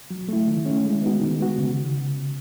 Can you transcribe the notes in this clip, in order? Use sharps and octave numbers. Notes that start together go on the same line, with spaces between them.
F#3
A3 E4
D#3
A3 C#4 E4
G#3
B3 D#4 F#4
D#3
G#3 B3 F#4
C#3